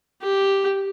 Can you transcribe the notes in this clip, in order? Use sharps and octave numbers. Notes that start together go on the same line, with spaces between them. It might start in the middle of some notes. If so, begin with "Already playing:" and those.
G4